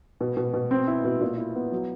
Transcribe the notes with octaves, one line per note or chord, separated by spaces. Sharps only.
B2
B2
B2
C4
E4
B2
A#2
E4
B3
F#3